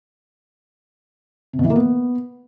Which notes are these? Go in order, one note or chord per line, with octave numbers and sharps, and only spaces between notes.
C3
B2
E3
A#3
B3